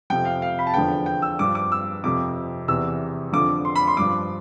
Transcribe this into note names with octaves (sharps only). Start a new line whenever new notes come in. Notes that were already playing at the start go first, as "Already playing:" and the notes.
F2 C3 F3 G5
F5
F5
B5
A5
E2 D3 F3 G5
G5
E6
G2 F3 D6
D6
E6
F2 C3 F3 D6
E2 C3 E3 E6
F2 D3 F3 D6
C6
B5
C6
G2 F3 D6